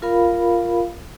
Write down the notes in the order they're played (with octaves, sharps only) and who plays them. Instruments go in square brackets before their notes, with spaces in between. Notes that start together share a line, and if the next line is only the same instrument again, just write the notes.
[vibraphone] F4 A#4 F5 B5